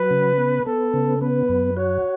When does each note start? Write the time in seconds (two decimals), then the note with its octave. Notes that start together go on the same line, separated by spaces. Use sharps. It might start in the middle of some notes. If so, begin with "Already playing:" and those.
Already playing: F#3 B4
0.11 C#3
0.38 B3
0.66 B3 A4
0.94 C#3
1.21 B3 B4
1.49 F#2
1.77 F#4 C#5